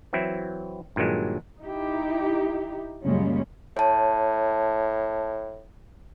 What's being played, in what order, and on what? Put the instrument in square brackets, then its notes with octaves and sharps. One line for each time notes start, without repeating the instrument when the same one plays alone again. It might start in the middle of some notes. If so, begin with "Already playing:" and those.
[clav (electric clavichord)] E3 F#3 C4 E4
G2 A#2 D#3 F#3 G#3
[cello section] D#4 E4 G4
F#2 A#2 C#3 G3 G#3 C#4
[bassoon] A2 [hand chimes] C#5 A5